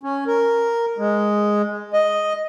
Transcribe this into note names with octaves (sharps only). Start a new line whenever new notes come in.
C#4
A#4
G#3
D#5